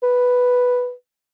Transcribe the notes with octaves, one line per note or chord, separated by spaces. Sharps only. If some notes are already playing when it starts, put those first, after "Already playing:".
B4